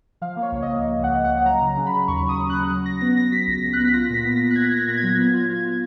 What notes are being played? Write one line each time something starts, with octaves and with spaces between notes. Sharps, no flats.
F3 F5
A#3
C#5
C#2
D#5
A#3
C#2
C#2 F#5
A#3
C#2 F#5
F#3 A#5
C#3
C#4
B5
C#3
D#2 C#6
F#3
D#6
C#4
F#6
C#4
F#3
F#3 A#6
B3 A#6
B3 A#6
F#3 B6
C#2
A#6
C#2
F#6
B3
B6
F4 A#6
A#2 B6
B3
A#2 A#6
F#6
A#2 G#6
A#2 A#6
A#2
G#6
F#3
B3
F4
F4
F4